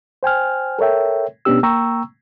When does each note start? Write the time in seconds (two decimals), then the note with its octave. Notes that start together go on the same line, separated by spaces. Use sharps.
0.23 C5 G5 G#5 F6
0.79 A4 A#4 C#5 E5 G5
1.45 B2 B3 C#4 D4 G4 E6
1.63 A#3 G5 A#5 C#6 E6